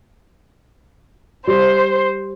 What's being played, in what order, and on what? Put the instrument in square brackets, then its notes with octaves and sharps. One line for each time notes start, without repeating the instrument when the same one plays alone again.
[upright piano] G3 [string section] C5